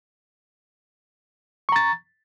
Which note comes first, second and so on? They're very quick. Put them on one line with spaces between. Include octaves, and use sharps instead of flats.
C#6 A#5 A6